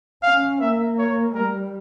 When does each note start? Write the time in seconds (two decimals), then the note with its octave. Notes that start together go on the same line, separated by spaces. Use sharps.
0.23 C#4 F5
0.60 A#3 E5
0.99 C#5
1.35 G3 A#4